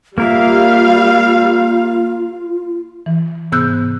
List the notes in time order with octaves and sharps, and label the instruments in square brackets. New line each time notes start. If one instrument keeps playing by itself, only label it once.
[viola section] G3 F5 [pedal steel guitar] A#3 A#4 E5 [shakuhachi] F4
[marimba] E3
G#2 C3 B3 E6 F#6 G6